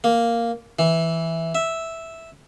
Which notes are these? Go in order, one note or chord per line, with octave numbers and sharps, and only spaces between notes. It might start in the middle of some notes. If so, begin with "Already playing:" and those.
A#3
E3
E5